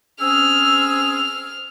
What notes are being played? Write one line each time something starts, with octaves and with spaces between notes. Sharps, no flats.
C4 C#4 G#4 E6 F6